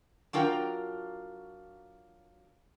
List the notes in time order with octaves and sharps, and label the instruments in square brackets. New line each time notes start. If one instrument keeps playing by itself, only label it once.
[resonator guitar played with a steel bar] F#3 D4 F4 A#4 G5